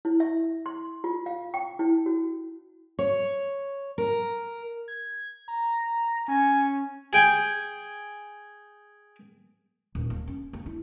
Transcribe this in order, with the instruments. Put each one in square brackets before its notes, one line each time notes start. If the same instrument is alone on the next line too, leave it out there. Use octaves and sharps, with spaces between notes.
[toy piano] E4
E5
C6
F4
F5
G5
E4
F#4
[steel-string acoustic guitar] C#5
A#4
[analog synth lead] G#6
A#5
[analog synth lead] C#4 [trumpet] G#5
[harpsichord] G#4 G5 G#5
[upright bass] D#1
A#3
C#4
A#3
E4